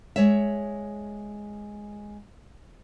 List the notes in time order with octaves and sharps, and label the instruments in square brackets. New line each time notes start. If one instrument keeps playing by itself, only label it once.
[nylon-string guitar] G#3 C#5 E5